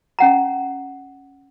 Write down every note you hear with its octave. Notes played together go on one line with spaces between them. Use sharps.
C#4 F#5 A#5